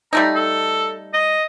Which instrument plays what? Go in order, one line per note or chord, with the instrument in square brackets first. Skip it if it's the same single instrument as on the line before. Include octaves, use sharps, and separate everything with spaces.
[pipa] G3 A3 D#4 [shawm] A#5
[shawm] A4
D#5